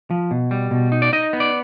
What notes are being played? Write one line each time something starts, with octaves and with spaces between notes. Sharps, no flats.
F3
B2
G3
B2
D#4
D5
D#4 D#5
B3
D5